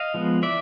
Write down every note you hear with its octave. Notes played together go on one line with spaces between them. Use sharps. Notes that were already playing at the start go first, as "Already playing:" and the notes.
Already playing: D#5 F5
F3 G#3 B3
E3 D5 E5